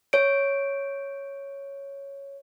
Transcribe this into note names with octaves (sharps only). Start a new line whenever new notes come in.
C#5 D7